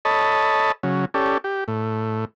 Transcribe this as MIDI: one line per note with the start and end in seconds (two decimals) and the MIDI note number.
0.05 0.72 69
0.05 0.72 73
0.05 0.72 75
0.05 0.72 81
0.05 0.72 83
0.83 1.05 49
0.83 1.05 54
1.14 1.38 61
1.14 1.38 67
1.14 1.38 69
1.14 1.38 74
1.44 1.64 67
1.68 2.25 45